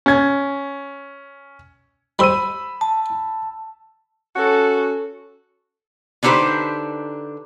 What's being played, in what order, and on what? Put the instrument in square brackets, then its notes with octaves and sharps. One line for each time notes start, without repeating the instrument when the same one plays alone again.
[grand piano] C#4 G#6
[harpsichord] G3 C5 [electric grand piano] B5 E6 D#7
[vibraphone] A5
[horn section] C#4 F#4 [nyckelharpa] A4
[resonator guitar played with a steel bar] D3 D4 D#4 G4 B4 C5